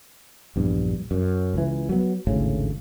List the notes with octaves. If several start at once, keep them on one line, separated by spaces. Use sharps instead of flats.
A#1 E2 G2
F#2
C#2 E3
F#3 B3
G#1 D2 A2 C#3